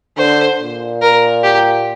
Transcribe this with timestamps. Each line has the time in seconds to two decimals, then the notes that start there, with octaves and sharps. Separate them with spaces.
0.18 D3 C5
0.60 A#2
1.02 A#4
1.44 G4